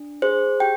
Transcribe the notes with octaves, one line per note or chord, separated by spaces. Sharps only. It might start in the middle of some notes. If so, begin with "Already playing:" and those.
Already playing: D4
G#4 C5
G4 G5